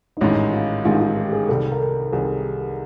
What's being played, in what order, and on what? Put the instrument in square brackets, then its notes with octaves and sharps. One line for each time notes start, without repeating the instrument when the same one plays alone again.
[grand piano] D#4
[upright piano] A1 G#2 D#3 G#3 C#4 [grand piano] E4
[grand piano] F4
[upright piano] A1 G#2 D#3 G#3 C#4 [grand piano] F4
[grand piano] F4
G4
G#4
[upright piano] C2 C3 D#3 G3 [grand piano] A4
[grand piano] A#4
A4
[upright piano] C2 C3 D#3 G3 [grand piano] G#4